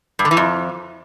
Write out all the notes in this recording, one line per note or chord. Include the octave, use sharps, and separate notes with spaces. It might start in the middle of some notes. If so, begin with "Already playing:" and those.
G2
D3
E3
F2